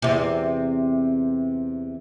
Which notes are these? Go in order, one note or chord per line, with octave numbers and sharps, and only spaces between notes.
E2 C3